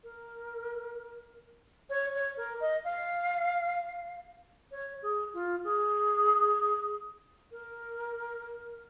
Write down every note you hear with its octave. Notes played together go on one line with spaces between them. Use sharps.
A#4
C#5
C#5
A#4
D#5
F5
C#5
G#4
F4
G#4
A#4